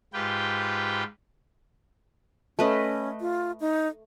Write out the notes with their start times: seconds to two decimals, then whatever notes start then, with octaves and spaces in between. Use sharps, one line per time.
0.14 G#2 F4 G4 B4 G5
2.59 A3 C#4 B4 D#5
3.21 F4
3.60 D#4